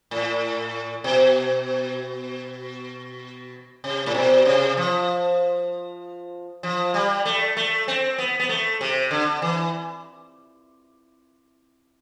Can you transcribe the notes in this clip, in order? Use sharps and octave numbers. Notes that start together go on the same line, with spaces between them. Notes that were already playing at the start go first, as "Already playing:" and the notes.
A2
B2
C3
A2
B2
C3
F3
F3
G3
A3
A3
C4
B3
B3
A3
C3
D3
E3